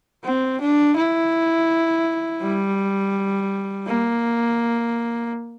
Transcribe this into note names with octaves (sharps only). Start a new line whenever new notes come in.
C4
D4
E4
G3
A#3